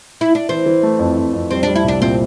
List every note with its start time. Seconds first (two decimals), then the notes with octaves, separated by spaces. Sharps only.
0.21 E4
0.35 D4
0.49 E3 C4
0.66 E3
0.83 A3
0.99 F2
1.17 F2
1.34 F2
1.51 G3 C4
1.63 G3 D4
1.75 E4
1.84 C2 D4
2.01 A#2 C4